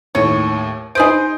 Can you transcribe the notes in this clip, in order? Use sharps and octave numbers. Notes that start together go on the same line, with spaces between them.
D#2 A2 C#5
D#4 G#4 B4 C5 D#6 D7